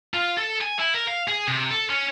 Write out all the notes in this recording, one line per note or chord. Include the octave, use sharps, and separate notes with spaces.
F4
A4
G#5
E4
A#4
F5
G#4
C3
A4
C#4